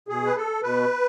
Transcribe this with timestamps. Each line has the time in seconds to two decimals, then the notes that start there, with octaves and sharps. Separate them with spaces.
0.08 B2 G#4
0.26 B4
0.36 A4
0.63 B2 B4